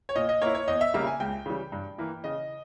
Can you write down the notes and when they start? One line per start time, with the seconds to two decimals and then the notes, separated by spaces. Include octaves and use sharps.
0.09 C#5
0.15 A#2 D#5
0.29 D#5
0.42 A#3 E4 C#5
0.55 C#5
0.68 E2 D#5
0.81 E5
0.94 C#3 G3 A#3 E5
1.07 G#5
1.20 C#2 G5
1.46 C#3 E3 G3
1.72 G2
1.98 E3 A#3 E4
2.24 C#3 D#5